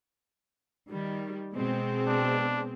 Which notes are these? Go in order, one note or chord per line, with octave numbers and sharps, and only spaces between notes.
D#3 G3
B2 G#3 C4
D4